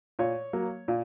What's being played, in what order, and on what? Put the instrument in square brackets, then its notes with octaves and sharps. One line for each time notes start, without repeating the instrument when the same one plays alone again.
[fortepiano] A#2 C#5
F#3 A#3
A#2